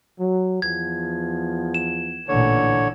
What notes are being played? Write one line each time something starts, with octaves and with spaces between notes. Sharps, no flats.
F#3
E2 F3 B3 G#6
E7
A1 A#2 D3 E3 C#5